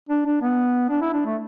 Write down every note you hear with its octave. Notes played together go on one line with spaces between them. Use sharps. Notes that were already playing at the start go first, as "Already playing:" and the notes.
D4
D4
B3
D4
E4
D4
A3